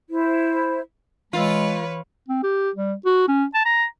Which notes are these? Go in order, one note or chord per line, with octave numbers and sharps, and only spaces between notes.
E4 C5
E3 G#3 F4 B4 C#5 E6
C4
G4
G3
F#4
C#4
A5
A#5